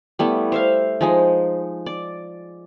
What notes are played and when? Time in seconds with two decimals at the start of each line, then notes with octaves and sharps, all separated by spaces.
0.19 G3 A3 B3 E4
0.52 C5 E5 F5
1.01 F3 G#3 D#4
1.86 D5